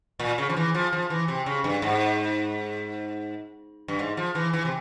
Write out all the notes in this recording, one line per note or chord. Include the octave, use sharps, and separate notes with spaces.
A#2
C#3
F3
E3
F3
F3
E3
C3
C#3
G2
G#2
G2
G#2
F3
E3
E3
C3